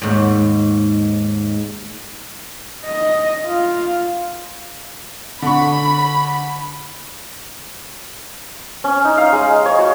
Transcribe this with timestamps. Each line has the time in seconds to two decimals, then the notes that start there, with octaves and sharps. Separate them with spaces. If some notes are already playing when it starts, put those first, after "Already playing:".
0.02 D#2 G#2
2.86 D#5
3.46 F4
5.42 D3 B5 C#6
8.84 C#4
9.05 D#4
9.17 F5
9.33 G#3
9.66 C#5
9.79 F#4